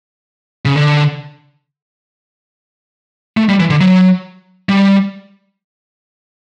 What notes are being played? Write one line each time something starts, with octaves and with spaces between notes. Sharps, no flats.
C#3
D3
A3
G3
E3
D3
F#3
G3